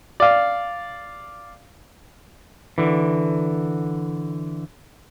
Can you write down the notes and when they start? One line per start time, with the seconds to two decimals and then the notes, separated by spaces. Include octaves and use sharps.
0.20 D5 F5
2.78 D3 E3